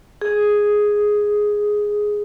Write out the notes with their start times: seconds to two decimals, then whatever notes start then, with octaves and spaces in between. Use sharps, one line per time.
0.21 G#4